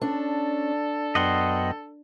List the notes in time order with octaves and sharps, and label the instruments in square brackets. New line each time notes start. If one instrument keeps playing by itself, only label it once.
[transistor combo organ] C#4 [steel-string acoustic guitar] D4 [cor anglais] A4
[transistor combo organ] F#2 B3 G5 [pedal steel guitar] D#5 F#5 C6